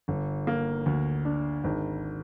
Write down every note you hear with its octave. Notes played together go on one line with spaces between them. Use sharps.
G1
A#3
D2
D4
G#1